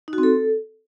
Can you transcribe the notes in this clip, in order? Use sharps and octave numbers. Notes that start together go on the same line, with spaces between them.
D#4
F#4
C4
A4